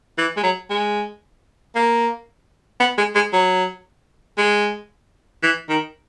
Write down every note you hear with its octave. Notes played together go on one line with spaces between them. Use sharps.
E3
G#3
F#3
G#3
A#3
B3
G#3
G#3
F#3
G#3
E3
D#3